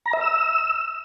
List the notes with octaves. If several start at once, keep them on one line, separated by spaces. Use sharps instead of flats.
A#5
E5
E6